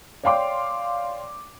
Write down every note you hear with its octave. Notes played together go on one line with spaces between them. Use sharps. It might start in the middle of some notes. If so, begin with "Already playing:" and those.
C#5 D5 F5 G5 C6 D6